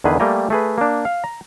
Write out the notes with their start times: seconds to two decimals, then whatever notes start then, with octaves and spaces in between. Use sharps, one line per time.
0.04 E2 D3 D#3 G#4 B4
0.20 G3 A3 A#3 G5 G#5 A#5
0.50 A3 G#4 B4
0.78 A#3 D4
1.05 F5
1.24 A#5